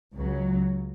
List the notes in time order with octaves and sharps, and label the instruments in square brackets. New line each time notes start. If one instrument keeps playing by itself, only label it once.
[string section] C#2 C#3 F#3